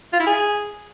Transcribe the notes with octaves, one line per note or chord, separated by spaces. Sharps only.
F4
E4
G#4